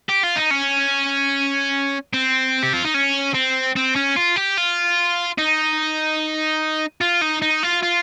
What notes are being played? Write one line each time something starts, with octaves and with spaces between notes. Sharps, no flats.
G4
F4
D#4
C#4
C4
G4
F4
D#4
C#4
C4
C4
C#4
F4
G4
F4
D#4
F4
D#4
D#4
F4
F4